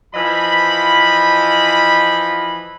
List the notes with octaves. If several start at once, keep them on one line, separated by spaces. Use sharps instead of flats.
E3 F3 D#5 B5